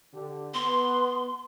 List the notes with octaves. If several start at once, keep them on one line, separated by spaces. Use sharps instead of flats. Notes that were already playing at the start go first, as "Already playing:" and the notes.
D3 G4
B3 C6